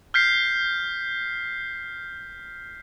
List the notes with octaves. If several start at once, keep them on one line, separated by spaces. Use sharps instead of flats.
F6 G6 B6 C7